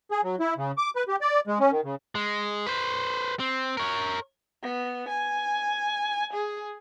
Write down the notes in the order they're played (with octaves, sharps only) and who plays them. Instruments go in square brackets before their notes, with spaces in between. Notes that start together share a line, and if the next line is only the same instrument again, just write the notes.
[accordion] G#4
F#3
E4
C#3
D6
B4
G4
D5
G#3
C#4
D#3
C#3
[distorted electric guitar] G#3
B4 C5
C4
A#4 C#5
[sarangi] B3
G#5
G#4